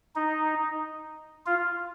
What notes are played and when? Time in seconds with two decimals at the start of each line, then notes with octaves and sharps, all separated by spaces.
0.16 D#4
1.46 F4